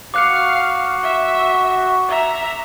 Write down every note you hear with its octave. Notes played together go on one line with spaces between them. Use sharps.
F#4 F5 D6 F#6 C#7
E5
E5 A#5